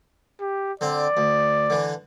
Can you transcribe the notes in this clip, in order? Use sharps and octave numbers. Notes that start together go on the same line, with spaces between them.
G4
D3 C4 D5
D2
D3 E3